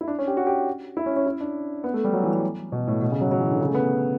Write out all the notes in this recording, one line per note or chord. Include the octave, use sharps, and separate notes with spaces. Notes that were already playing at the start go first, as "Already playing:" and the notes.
E4
D4
C#4
G4
F#4
G4
E4
C#4
C#4
E4
D4
B3
A3
G3
F#3
E3
F#3
B2
A2
B2
C#3
F#3
F#3
E3
D3
C#3
A3
B3